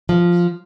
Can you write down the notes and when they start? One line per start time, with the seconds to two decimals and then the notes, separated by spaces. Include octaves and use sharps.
0.09 F3